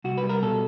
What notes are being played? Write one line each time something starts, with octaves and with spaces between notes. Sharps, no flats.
C2 F#4
B4
G3
A#4
B2 A4